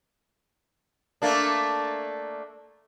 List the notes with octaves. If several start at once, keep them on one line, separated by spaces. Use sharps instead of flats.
A3 A#3 D4